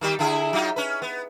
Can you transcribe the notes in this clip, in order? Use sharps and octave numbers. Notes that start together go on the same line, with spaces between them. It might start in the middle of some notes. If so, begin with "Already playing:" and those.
D#3 G3 G4
D3 E4 G#4
F#3 D#4 F4
C#4 B4
B3